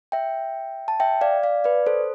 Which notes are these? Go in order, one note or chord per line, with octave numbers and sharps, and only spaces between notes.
E5 G5
A5
E5 G5
D5 F5
D5 F5
B4 D5
A4 C5